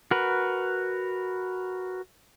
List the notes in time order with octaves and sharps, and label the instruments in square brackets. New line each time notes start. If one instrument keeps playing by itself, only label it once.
[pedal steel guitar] F#4 A#4 B4